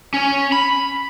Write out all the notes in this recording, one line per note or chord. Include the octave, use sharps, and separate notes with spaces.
C#4
B5